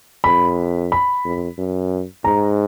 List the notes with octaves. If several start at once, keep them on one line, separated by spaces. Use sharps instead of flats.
F2 B5
B5
F2
F#2
G#2 A#5